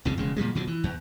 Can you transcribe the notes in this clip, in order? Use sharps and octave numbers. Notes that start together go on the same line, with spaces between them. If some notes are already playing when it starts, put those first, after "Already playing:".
C2 F2 G#2 C#3
E1 C#3 G#3
A#2 F3 G3 G#3
B2 D3 F3 F#3
E3
E2